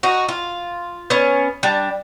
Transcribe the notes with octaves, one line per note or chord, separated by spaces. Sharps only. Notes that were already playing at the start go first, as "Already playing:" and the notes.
D#4 F#4
F4
B3 C#4
G3 D4